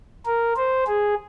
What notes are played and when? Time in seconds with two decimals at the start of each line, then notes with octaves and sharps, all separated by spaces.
0.26 A#4
0.57 C5
0.87 G#4